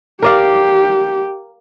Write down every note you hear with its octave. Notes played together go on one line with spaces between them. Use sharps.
G4 A#4 D5 F5